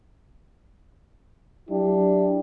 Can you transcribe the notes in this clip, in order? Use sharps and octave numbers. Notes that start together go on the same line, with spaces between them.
F#3 D4 E4 G4